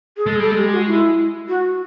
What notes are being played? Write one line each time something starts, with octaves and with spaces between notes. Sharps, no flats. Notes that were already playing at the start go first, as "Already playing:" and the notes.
G#4
G#3 A4
G3 A4
G#3
G4
F#4
E4
F#4